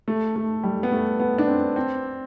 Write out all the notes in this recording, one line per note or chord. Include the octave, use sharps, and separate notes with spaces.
A3
A3
G3
B3
A3
B3
D4
C4
C4